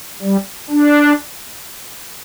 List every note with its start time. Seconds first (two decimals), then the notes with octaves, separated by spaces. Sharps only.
0.22 G3
0.70 D4